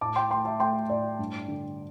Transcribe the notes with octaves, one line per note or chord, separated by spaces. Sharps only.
A2 A5 D6
G5 C6
A3 G5 C6
E5 A5
A3 G5 C6
A2 D5
G2
D3